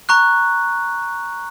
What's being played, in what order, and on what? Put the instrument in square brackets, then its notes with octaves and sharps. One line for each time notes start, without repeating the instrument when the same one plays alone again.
[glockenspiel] A#5 C#6 F#6